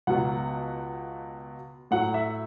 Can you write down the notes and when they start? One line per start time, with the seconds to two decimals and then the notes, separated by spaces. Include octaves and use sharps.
0.07 C#2 B2 F#3 F#5
1.91 A2 F#3 F#5
2.14 E5